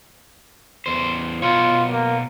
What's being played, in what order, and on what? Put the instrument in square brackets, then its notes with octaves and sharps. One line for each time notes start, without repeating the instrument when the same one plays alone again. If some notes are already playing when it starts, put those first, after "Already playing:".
[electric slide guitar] E2 C5
[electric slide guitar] B2 A#4 C#5 [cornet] F4
[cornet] A#3